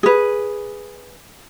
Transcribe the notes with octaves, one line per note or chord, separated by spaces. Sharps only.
G#4 B4